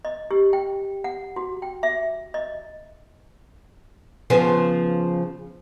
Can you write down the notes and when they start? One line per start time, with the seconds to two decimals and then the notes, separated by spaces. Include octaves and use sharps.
0.05 D#5
0.31 G4
0.53 G5
1.04 F#5
1.36 F#4
1.62 G5
1.83 E5
2.34 D#5
4.30 C#3 F3 B3